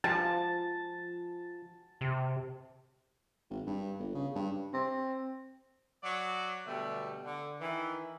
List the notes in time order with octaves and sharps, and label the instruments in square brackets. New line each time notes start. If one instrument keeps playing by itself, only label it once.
[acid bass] F3 [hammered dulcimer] A5
[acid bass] C3
[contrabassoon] G#1
G2
G1
C#3
G2
[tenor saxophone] C4
[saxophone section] F#3 C#5 D5
B2 D3 G3 A3
D3
D#3 E3